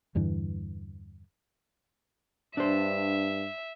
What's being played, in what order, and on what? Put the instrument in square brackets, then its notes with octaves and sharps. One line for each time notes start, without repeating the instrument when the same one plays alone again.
[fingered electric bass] E2 G2 D3 E3
[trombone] G2 [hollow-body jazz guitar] D4 C5 [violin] E5